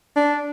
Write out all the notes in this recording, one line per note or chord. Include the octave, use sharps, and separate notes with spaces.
D4